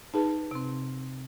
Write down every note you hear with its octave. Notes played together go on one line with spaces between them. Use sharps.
D#4 G#4 B4 A5
C3 C4